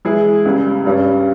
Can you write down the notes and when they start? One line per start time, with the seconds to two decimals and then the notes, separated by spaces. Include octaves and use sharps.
0.05 E3 G#3 E4 G#4
0.45 C#2 C#3 G3
0.85 G2 G3 C#4